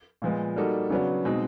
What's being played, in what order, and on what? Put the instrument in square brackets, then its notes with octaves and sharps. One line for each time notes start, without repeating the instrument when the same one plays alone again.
[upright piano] A#2 F3 G#3 B3
G3 A#3 D#4 F#4 A4
C#3 F#3 B3 D4 F#4
B2 G#3 C4 D#4